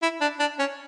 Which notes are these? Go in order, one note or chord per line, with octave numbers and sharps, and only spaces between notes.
E4
D4
D4
C#4